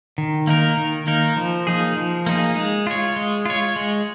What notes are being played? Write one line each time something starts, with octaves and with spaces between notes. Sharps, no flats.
D#3
A#3 D#4 A#4
D#3
A#3 D#4 A#4
F3
A#3 D#4 G#4
F3
A#3 D#4 G#4
G#3
F4 C#5
G#3
F4 C#5
G#3